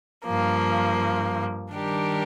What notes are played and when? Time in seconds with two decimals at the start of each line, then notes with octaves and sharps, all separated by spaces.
0.24 G2 F3 A#3
1.72 D#3 G3 D4 G4 A#4